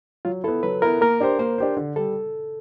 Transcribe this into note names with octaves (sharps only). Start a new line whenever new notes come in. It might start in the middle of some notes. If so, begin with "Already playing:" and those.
F#3 F4
B3 E4 A4
F#3 B4
B3 E4 A#4
A#3 A#4
D4 G4 C5
A#3 C5
D4 G4 C5
D3
G3 A4